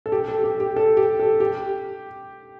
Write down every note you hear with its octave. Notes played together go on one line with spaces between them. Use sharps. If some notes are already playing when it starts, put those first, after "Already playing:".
A4
G4
A4
G4
G4
A4
G4
A4
G4